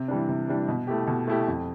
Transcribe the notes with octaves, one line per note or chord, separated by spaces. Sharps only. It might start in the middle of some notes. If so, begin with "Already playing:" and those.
Already playing: C3
E3 G3 D4
C3
E3 G3 D4
B2
A3 E4 G4
B2
A3 E4 G4
F2